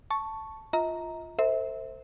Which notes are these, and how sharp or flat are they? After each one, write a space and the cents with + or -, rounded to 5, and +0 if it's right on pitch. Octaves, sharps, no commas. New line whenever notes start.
A5 +0 C#6 +0
F4 +0 D#5 +45 A#5 +0
A4 +45 C5 +0 E5 -25